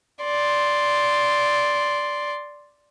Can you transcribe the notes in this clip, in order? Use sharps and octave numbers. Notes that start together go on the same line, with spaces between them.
D5 C6